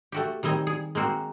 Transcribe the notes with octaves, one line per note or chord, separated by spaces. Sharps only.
A3 F#4 G4
D#3 G3 C4 D#5 G#5
G#4
G#3 A#3 C4 F#4